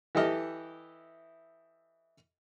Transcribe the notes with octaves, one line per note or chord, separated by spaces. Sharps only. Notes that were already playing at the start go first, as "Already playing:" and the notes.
E3 E4 G4 A4 D#5 F6